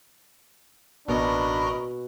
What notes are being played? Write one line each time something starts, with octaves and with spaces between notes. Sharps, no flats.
A1 B2 D4 A#4 D#5 B5 C#6